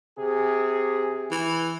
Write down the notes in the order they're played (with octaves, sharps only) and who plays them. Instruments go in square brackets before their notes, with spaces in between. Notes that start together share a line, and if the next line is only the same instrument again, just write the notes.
[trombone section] C3 G#4
[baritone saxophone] E3